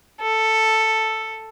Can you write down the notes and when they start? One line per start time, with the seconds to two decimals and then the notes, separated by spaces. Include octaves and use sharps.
0.21 A4